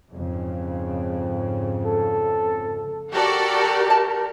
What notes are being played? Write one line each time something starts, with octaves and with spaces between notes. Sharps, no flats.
F2 G#2 C#3
A4
F#4 G4 A4 A#4 D5
A5